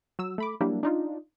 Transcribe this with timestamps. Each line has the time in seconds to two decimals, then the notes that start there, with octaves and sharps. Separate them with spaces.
0.19 F#3 E6
0.38 A3 B5 D6
0.61 F#3 G3 A#3 D4 E4
0.83 D4 D#4 F4